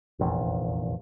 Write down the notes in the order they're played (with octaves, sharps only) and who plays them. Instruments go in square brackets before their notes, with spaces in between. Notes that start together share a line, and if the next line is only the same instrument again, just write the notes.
[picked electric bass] F1 A#1 E2